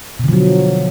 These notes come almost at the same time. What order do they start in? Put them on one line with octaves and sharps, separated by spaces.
B2 D3 F3 F#3